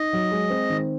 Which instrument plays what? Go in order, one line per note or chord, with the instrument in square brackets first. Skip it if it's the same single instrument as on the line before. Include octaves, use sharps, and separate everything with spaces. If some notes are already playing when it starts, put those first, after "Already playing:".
Already playing: [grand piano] D#4 [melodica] D#5
[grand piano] F#3
G#3
C4
D#3